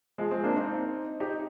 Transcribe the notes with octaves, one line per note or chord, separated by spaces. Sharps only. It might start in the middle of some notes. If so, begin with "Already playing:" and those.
F3 G#3
G#3 C4
A#3 D4
C4 D#4
D#4 G4